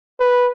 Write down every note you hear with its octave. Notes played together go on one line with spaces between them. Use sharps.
B4